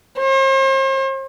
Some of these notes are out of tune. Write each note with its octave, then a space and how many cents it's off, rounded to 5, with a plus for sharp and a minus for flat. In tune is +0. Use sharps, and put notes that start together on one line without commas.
C5 +45